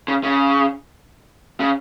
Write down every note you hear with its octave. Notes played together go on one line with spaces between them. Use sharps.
C#3
C#3
C#3